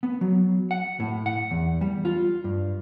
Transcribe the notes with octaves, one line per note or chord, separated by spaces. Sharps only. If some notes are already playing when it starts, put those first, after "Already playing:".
B3
F#3
F#5
A2
F#5
E2
G3
F4
G2